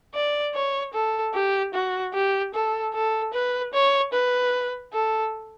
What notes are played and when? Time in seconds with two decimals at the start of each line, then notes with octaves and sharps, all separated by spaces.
0.15 D5
0.55 C#5
0.94 A4
1.34 G4
1.74 F#4
2.14 G4
2.54 A4
2.94 A4
3.34 B4
3.73 C#5
4.13 B4
4.93 A4